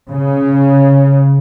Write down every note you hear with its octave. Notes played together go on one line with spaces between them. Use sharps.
C#3